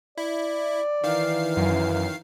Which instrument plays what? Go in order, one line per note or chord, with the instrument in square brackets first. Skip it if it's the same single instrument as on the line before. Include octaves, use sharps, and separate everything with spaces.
[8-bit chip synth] E4 [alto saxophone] D5
[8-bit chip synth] D#3 F5 C7 [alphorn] E3
[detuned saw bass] F#2